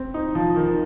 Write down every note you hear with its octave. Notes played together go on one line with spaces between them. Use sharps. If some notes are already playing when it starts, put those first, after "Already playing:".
Already playing: C4
D#4
F3
D#3